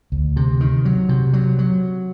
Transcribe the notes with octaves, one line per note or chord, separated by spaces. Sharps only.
D2
C3
D#3
F#3
C3
F#3
F#3